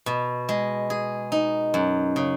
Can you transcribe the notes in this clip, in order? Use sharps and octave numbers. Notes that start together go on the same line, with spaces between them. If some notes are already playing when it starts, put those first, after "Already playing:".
B2
G#3
G#4
D#4
F#2
C#3